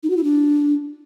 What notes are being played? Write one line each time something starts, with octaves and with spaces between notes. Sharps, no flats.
D#4
F#4
E4
D4